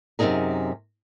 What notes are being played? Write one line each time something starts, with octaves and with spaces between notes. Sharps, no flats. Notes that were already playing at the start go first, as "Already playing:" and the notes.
F#2 C3 E3 D#4 G#4 A#4